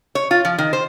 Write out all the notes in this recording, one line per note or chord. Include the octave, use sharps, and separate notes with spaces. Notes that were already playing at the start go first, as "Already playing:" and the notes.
C#5
F4
F3
D#3
C5